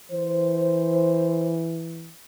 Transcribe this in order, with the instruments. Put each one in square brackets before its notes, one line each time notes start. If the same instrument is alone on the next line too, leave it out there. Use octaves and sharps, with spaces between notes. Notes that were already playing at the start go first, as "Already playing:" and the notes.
[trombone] E3 [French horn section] C5